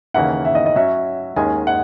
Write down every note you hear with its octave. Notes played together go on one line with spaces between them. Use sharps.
D#2 C#3 E3 A#3 E4 F#5
E5
D#5
D#5
F#3 C#4 F#4 E5
D#2 D#3 G#3 C#4 G#5
F#5